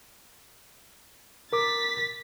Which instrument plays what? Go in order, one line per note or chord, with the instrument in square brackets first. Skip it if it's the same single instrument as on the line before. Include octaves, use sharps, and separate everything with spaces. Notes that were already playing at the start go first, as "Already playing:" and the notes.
[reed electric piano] A#4 D6 [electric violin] A6 B6